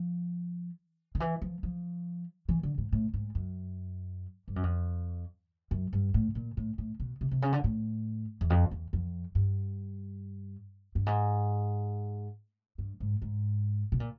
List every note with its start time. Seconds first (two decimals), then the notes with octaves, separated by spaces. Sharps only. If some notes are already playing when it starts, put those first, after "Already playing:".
Already playing: F3
1.15 D#3
1.20 E3
1.42 F3
1.63 F3
2.49 E3
2.63 D3
2.78 G#2
2.92 A2
3.14 G#2
3.35 F#2
4.48 G2
4.56 F#2
4.63 F2
5.71 F#2
5.93 G2
6.14 A2
6.35 A#2
6.57 A2
6.78 A2
7.00 B2
7.21 C3
7.31 C3
7.42 C#3
7.53 D3
7.64 A2
8.41 E2
8.50 F2
8.71 E2
8.93 F2
9.35 G2
10.95 G2
11.06 G#2
12.78 G2
13.00 G#2
13.22 G#2
13.92 B2
14.00 A#2